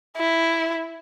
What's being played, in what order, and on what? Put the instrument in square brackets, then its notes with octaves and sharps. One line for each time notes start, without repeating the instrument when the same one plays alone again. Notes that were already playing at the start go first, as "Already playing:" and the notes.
[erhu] E4